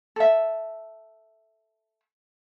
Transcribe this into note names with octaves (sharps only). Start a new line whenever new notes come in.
A4 E5